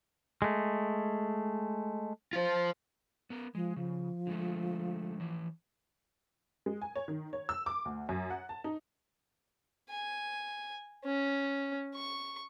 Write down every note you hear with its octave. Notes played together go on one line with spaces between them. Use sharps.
G#3 A3
F4 C5
B3 A#4
F3 G#3
C#3 F3
D3 G#3 A3
E3 C#5
G#3
G#5
C#5
D#3
C#5
E6
D6
D2
F#2
F#5
A5
D#4
G#5
C#4
C#6